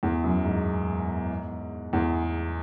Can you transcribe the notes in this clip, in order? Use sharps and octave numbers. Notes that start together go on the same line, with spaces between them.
E2
F#2
G#2
E2